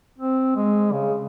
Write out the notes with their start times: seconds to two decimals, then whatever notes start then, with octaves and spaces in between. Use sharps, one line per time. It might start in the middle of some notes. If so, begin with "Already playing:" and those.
0.19 C4
0.56 G#3
0.93 C#3